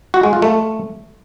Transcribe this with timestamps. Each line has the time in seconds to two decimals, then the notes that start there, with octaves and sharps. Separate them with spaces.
0.14 F#4
0.23 G#3
0.33 F4
0.42 A3